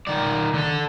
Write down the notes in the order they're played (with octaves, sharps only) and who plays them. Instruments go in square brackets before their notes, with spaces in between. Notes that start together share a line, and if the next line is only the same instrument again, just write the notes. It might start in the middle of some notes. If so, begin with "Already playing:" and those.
[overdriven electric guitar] D#3 D5
D3 A4